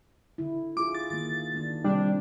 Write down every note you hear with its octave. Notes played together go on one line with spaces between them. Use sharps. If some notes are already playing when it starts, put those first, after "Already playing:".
D3 E4
F4 G#4 D6
A6
D#3 A#3 A6
D#3 A#3 D4
C3 D#3 G3 C4 D4